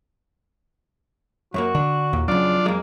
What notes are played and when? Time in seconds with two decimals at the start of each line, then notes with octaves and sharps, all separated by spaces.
1.54 F#2 F#3 A#3 F#4
1.75 D3 D4
2.13 D#2 A#2
2.28 F2 C#3 F#3 D4 F4 D5
2.66 F2 G#3 A#3